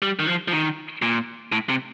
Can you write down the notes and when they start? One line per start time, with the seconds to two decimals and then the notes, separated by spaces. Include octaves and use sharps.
0.02 G3
0.19 D#3
0.27 F3
0.48 F3
0.52 D#3
1.02 A#2
1.52 A2
1.69 C3